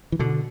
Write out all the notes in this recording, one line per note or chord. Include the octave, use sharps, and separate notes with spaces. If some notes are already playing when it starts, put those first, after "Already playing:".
E3
B2 D3